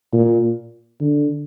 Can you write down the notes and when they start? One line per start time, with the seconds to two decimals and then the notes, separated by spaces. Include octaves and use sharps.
0.13 A#2
1.00 D3